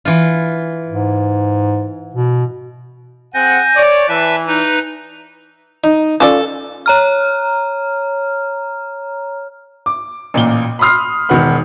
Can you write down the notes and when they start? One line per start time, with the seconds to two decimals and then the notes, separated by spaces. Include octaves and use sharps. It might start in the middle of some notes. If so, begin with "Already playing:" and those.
0.05 E3 F4
0.87 G#2
2.14 B2
3.34 C4 G#4 F#5 G#5 G6 A#6
3.76 C#5 D5
4.08 E3 B4 E5 A5
4.47 D#4 B4
5.84 D#4
6.20 C#4 F4 A4 D5 A5
6.86 C#5 A#5 F6
9.86 D6
10.34 A1 A#2 A#3 G7
10.79 B5 C6 D#6 F6 C7
11.29 E1 D#3 B3 B4 F#5 B5